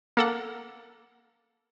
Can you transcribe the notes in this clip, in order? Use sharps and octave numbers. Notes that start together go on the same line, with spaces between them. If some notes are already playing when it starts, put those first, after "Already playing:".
A#3 A4 F#5